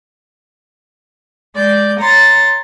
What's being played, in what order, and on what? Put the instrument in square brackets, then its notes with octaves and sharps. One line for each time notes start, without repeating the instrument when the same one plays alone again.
[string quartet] G#3 D5 G6
C#5 A#5 C6 A6